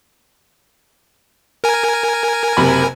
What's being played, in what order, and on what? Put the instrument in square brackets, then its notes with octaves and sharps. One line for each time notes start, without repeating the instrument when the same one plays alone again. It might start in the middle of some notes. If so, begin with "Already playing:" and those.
[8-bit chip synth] A#4 G#5
[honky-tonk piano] F#1 C3 B5